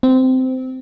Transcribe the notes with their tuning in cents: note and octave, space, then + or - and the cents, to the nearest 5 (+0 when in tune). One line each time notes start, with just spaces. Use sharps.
C4 -15